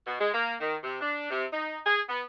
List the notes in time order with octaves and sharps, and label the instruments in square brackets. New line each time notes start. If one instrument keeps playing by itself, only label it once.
[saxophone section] B2
G#3
A#3
D#3
C3
D4
C3
D#4
G#4
B3